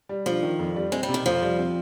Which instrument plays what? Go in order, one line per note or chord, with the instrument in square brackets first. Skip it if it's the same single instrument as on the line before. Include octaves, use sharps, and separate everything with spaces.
[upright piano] G3
[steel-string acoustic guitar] F3 [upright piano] D4
[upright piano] D#3
F2
G3
[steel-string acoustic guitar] G#3 [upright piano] C4
[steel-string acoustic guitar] G3
[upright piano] C3
[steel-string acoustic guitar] D#3
[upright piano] F2 [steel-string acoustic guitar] F3
[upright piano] G3
C4